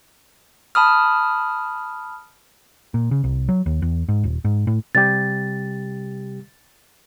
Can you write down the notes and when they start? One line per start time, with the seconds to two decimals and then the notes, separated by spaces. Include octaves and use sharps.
0.75 A5 B5 D#6 F6
2.94 A#2
3.11 C#3
3.24 C2
3.49 F#3
3.66 D#2
3.82 E2
4.09 G#2
4.24 D#1
4.45 G#2
4.67 A2
4.95 C3 G3 G4 A6